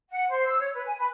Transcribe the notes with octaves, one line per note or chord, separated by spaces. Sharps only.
F#5
C5
E6
C#5
B4
G#5
B4